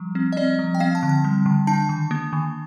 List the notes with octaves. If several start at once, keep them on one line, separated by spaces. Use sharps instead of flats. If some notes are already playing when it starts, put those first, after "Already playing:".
Already playing: F3 G3
C4
D#5
C4 D5
F3
G5
C4 F5
A5
D3
A5
G3
D3
D4 A5
D#3
A#3
D#3